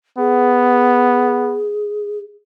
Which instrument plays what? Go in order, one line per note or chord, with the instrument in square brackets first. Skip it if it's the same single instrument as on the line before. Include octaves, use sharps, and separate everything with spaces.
[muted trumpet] B3 [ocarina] G#4